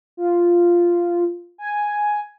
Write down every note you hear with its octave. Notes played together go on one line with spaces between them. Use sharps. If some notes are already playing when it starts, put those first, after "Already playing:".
F4
G#5